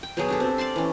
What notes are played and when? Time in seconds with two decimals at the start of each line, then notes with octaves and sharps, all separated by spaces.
0.03 G5
0.17 B2 F#3 G#4
0.29 D4 G4 A4
0.40 C4
0.58 D5 F5 A5 C6
0.76 E3 C#4